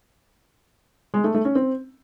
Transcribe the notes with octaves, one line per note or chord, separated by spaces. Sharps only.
G#3
A3
A3
C#4
C4